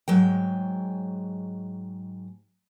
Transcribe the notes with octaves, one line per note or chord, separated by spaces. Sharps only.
G#2 F#3 G#3 G5